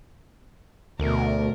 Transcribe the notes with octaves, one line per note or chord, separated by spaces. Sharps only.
D2 B2 A3 A#4